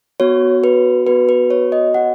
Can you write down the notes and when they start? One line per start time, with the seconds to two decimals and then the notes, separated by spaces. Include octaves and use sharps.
0.20 B3 F#4 C#5
0.64 B4
1.07 B3 F#4 B4
1.29 B4
1.51 C#5
1.72 D#5
1.94 B3 F#4 F#5